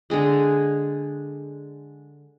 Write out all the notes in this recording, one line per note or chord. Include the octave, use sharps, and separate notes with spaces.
D3 G#3 G#4